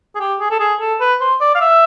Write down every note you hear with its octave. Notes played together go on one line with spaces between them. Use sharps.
G#4
G4
G#4
A4
G#4
A4
B4
C5
D5
F5
E5